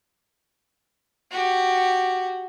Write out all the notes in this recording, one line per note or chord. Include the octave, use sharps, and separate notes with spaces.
F#4 G4